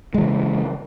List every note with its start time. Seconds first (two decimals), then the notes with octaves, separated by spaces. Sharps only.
0.14 G#3
0.18 E3
0.21 C#3